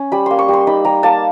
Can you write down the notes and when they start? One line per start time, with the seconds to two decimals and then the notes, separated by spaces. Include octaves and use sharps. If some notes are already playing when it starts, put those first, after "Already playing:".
Already playing: C#4
0.12 G3 B5
0.26 A#3 C6
0.39 C#6
0.48 G3
0.53 C6
0.67 D#4 B5
0.85 G3 A#5
1.03 A#3 A5